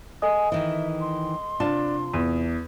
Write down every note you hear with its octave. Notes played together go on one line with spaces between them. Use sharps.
A4 D#5 G#5 D#6
D#3 E3 E5
C6
C3 D4 F4 A5
E2 D#7